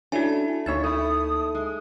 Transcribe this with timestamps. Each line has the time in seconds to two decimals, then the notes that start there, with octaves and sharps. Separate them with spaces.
0.12 A3 C#4 D4 E4 F#4 G#5
0.66 D2 A#2 A#3 D#4 C#5 A6
0.84 A3 E4 D#6
1.55 G#3